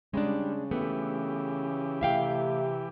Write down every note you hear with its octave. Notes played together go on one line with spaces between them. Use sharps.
C#3 G3 G#3 D4
E3 A3 B3 G4
A2 C3 E5 F5 G5